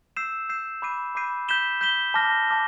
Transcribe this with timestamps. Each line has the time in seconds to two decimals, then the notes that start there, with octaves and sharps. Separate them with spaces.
0.17 E6 G6 C7 E7
0.49 E6 G6 C7 E7
0.82 B5 D6 G6 C7 D#7
1.15 B5 D6 G6 C7 D#7
1.48 G6 B6 E7 G7
1.81 G6 B6 E7 G7
2.14 A5 D6 F6 A#6
2.48 A5 D6 F6 A#6